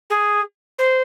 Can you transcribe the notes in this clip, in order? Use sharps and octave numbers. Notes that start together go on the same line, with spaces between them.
G#4
C5